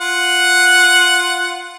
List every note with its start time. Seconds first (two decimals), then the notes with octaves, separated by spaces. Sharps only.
0.01 F4 F#5